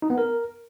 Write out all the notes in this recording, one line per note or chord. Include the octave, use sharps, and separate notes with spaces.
D#4
B3
A#4